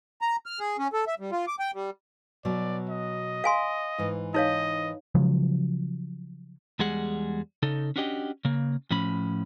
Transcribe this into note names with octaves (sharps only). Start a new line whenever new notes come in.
A#5
F6
G#4
C#4
A4
E5
G3
F4
D6
G5
G3
B2 F#3 D5
D#5
F5 G#5 C6
G#2 E3
D#4 C#5 D#5 F5
C#3 F3 F#3 G#3
E2 G3 G#3 G#4 F#5
C#3 D#4 A4
C#4 D4 F#4 G4 D#5 G5
C#3 A#3
A2 F3 C#4 B5